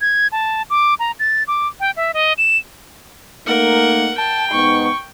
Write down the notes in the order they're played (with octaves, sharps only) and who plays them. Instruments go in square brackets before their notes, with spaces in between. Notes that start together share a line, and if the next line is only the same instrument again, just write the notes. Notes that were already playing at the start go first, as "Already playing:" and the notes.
[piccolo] G#6
A5
D6
A#5
A6
D6
G5
E5
D#5
E7
[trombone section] A3 A#3 D#4 [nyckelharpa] A#4 F#5
[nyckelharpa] G5 [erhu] A5
[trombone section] G#2 B3 D#4 [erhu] C#6